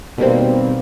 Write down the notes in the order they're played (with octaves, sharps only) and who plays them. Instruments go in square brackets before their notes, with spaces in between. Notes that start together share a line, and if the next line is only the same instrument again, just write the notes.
[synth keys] B2 D#3 G3 A#3 C4